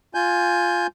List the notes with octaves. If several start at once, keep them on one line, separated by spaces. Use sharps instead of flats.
F4 G#5 G6